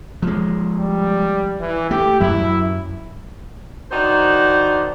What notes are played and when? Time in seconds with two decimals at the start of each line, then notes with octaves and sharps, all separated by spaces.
0.22 F3 G#3
0.79 G3
1.60 E3
1.91 A3 G4
2.20 F#2 F#3 E4
3.91 D#3 D4 D#4 F#4 C5